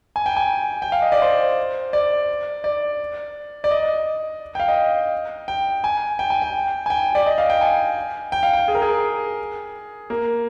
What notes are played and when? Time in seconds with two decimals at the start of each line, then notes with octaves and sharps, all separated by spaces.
0.16 G#5
0.26 G5
0.37 G#5
0.82 G5
0.92 F5
1.02 D#5
1.12 D5
1.22 C5
1.93 D5
2.64 D5
3.64 D5
3.71 D#5
4.55 G5
4.60 F5
4.68 D#5
5.48 G5
5.84 G#5
6.19 G5
6.30 G#5
6.42 G5
6.86 G#5
6.90 G5
7.15 D5
7.26 D#5
7.38 F5
7.50 G5
7.61 G#5
8.32 G5
8.43 F5
8.53 G5
8.68 G#4
8.75 A#4
8.82 G#4
10.10 A#3